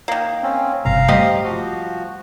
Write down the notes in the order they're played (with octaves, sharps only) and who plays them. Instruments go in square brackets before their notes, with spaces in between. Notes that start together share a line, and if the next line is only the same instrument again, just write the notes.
[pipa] D#3 A#3
[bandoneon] C4 C#4
[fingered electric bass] G1 C3 [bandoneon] F5 A#5
[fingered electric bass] G3 A3 [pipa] C4 G4 D#5
[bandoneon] F3 F#4